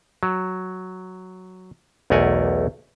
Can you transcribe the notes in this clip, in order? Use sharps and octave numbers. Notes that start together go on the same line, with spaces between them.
F#3
B1 E2 A3 A#4 F#5 G#5